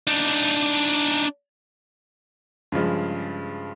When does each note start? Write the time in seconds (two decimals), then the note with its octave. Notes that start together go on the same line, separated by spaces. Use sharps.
0.07 D4 D#4
2.72 G2 C#3 F3 G#3